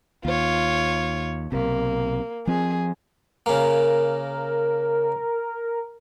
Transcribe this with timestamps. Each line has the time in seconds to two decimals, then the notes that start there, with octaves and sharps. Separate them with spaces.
0.25 D#2 F4 C#5
1.52 B1 C3 A#3
2.47 F3 C4 G#4
3.46 C#3 A#3 A#4